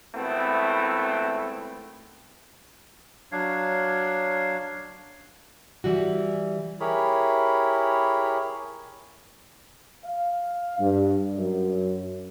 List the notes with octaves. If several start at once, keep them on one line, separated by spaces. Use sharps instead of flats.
G#1 A3 B3 C4 E4
F#3 D4 C#5 F5
E3 G3 F#4
E4 G4 G#4 A#4 C#5 B5
F5
G2
F#2